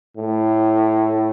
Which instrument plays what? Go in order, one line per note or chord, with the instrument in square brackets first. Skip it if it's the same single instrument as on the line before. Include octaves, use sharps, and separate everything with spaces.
[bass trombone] A2